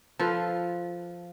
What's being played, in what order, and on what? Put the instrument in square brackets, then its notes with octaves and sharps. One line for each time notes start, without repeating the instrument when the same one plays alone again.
[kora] F3 F4 A4 B4